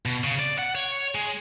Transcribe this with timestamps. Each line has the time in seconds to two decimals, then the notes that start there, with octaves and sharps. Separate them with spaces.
0.06 B2
0.24 C#3
0.39 D5
0.58 F#5
0.75 C#5
1.15 G#3